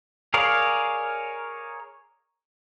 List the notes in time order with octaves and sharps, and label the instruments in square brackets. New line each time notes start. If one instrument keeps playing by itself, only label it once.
[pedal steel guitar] G#4 A#4 C#5 D5 F5